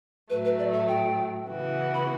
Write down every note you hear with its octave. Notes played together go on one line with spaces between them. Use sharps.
A2 F#3 A3 B4
B4
D5
E5
G5
C#3 E3 B3 F#4
B5